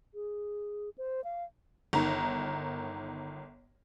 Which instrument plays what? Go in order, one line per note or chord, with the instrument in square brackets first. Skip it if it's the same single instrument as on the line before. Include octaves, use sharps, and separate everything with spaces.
[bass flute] G#4
C5
F5
[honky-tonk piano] G1 D#3 A#5